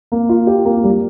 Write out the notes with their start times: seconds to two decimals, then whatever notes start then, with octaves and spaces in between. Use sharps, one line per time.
0.12 A#3
0.29 F4
0.47 G4
0.65 A#3
0.84 G3